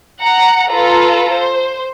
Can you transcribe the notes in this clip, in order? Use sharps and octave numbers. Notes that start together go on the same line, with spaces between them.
F#5 A#5
F4 A4 B4 A#5
C5